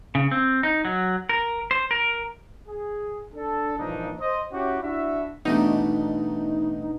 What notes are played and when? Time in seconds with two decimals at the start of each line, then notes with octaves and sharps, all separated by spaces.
0.15 C#3
0.31 C4
0.63 D#4
0.85 F#3
1.29 A#4
1.71 C5
1.91 A#4
2.67 G#4
3.35 D4 A4
3.77 G2 A#2 E3 F3 D4 D#4
4.19 C5 D#5
4.53 C#4 E4 F#4 G4
4.82 D4 E4 F#4 E5
5.45 B2 E3 G3 A3 D4 D#4